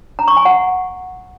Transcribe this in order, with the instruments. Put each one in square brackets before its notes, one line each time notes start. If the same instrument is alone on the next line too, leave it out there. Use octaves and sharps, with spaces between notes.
[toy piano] A#5
C#6
G#5
F#5